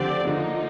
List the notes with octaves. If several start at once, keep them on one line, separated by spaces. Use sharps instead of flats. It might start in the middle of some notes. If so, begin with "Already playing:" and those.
Already playing: D3 F3 C4 G4 D5
D3 F3 A#3 D#4